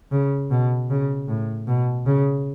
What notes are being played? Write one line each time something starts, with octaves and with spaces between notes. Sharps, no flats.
C#3
B2
C#3
A2
B2
C#3